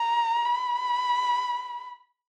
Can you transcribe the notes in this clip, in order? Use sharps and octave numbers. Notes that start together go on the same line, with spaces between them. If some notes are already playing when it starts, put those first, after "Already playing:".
Already playing: A#5
B5